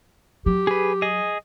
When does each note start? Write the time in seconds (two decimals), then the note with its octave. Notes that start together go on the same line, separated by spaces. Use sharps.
0.46 F#3 G4
0.67 G#4 B4
1.02 G#4 D#5